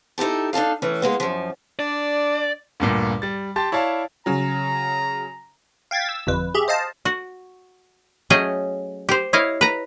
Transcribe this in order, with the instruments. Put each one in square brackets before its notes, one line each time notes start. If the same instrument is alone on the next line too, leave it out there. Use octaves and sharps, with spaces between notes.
[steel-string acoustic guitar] D#4 E4 G4 A4
D4 D#4 G#4 A4 F5
A2 E3 C#4
G#3 A#3 B3
F#2 F3
[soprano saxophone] D4 [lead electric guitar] D5
[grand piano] D2 G2 A#2
G3 A6
G4 A5 C6 A6
E4 C#5 D5 F5 A5
[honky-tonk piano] C#3 F#3 [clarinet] A#5
[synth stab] F5 G5 G#6 A6 B6
E6
G1 F2 B4
G4 G#4 E5
C5 D#5 F5 A5
[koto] F#4
F#3 A3 C#4 G#4 D#5 G5
G4 C5
E4 C#5 D#5 F5
B4 A#5